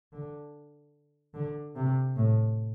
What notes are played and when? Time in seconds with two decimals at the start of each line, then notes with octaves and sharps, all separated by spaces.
0.12 D3
1.34 D3
1.75 C3
2.16 A2